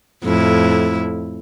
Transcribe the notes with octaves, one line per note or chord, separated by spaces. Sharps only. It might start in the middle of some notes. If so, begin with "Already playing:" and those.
F2 A2 E4